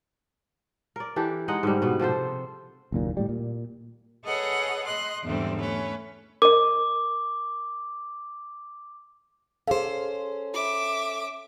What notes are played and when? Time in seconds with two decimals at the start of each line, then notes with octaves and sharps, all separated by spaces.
0.96 A#4 D5
1.16 E3 D4 G4 A4
1.48 G#3 D#4 D#5 F#5
1.63 G#2 D3 G3
1.82 B2 B3
2.00 C3 F3 A4 C5
2.92 F#1 D#2 A#2
3.17 A2 G3
3.29 A#2
4.25 G#4 A4 B4 C#5 D#5 F#5
4.86 D#5 C6 F#6
5.24 E2 G#2 D3 E3 G3 C4
5.59 A3 C#4 B4
6.42 A#4 D#5 D6
9.67 C#4 G#4 A4 C5 F5
10.54 F4 E5 D6